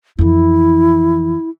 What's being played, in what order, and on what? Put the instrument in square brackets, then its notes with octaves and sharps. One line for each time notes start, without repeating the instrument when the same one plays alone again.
[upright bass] F2 E3 [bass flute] E4